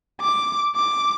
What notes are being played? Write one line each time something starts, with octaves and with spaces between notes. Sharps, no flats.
D6
D6